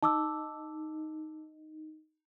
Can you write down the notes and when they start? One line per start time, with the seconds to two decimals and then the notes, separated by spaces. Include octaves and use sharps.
0.03 D#4 A5 D6 E6